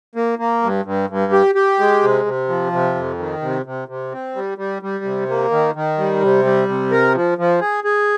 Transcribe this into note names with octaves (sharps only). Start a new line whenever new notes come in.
A#3
A#3
G2
G2
G2
G4
G4
G#3
C3
C3
F3
C3
F2
D#3
C3
C3
C3
C4
G3
G3
G3
C3
A#3
D#3
D#3
G3
C3
G3
C3
A#4
F3
F3
G#4
G#4